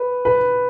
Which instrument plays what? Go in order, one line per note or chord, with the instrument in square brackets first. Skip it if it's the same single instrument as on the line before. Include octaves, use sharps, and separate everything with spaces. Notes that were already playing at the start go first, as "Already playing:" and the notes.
Already playing: [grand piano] B4
B4